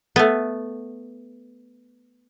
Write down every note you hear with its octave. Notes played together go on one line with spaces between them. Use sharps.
A3 B3